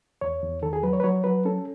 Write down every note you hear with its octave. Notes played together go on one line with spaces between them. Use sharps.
E2 C#5
E2
D#3 A4
G#4
F#3 B4
C#5
B4
F#3 C#5
F#3 B4
C#4 A4